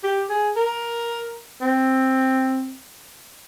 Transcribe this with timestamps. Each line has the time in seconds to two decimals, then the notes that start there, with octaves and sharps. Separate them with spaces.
0.04 G4
0.30 G#4
0.56 A#4
1.61 C4